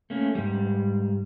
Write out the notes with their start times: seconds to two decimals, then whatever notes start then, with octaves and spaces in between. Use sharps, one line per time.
0.10 A3 A#3 C#4
0.35 G#2 G3